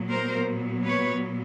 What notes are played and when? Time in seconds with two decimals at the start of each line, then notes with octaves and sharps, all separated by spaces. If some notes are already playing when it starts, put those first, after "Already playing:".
Already playing: A#2 F#3 B3
0.09 A#4 C5
0.85 B4 C#5